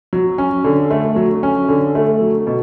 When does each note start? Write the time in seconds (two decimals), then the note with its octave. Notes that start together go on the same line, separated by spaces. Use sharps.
0.13 F#3
0.38 C#4
0.64 D3
0.91 A3
1.16 F#3
1.43 C#4
1.69 D3
1.95 A3
2.21 F#3
2.47 B2